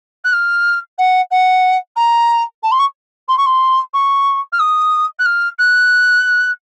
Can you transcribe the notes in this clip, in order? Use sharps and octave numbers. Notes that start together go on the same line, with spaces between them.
F#6
F6
F#5
F#5
A#5
A5
C6
C#6
C6
C#6
C6
C#6
F6
D#6
F#6
F6
F#6